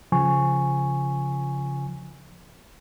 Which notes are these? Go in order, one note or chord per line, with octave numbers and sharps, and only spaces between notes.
C#3 F3 G#5 C#6